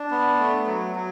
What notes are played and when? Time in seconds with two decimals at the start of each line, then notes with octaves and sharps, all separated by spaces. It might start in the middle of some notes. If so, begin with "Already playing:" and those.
Already playing: D4
0.11 B3
0.39 A3
0.67 F#3
0.96 F#3